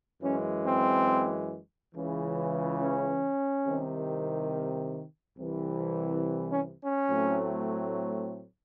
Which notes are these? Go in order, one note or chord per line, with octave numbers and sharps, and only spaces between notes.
F#2 E3 G#3 C#4
C4
C#2 C#3 E3
C#4
C2 C3 D#3
C2 C3 E3
C#4
C#4
A2 F#3 A3 C4